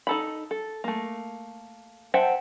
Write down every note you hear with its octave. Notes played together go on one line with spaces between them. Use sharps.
D#4 A4 B5
A4
A3 A#3
C5 E5 F#5 G5 A5